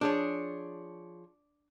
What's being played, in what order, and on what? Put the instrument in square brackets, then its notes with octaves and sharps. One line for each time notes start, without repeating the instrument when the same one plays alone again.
[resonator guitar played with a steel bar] F3 G#4 C#5 [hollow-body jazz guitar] D4